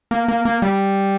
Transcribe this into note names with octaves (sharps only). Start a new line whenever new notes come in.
A#3
A#3
A#3
G3